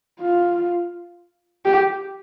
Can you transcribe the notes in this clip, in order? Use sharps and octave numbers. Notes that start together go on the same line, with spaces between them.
F4
G4